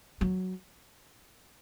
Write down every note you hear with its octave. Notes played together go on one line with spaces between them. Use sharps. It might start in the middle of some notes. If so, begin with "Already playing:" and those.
F#3